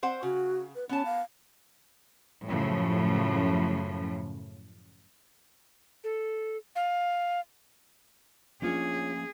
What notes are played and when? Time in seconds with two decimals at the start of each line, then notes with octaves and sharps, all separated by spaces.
0.03 C4 C5 F#5
0.23 C#3 F#4
0.75 B4
0.89 B3 C#4 A5
1.05 F5
2.45 F#2 A2 C#3 F3
6.04 A4
6.76 F5
8.62 F3 A#3 C#4 D4 F4 G#4 C#5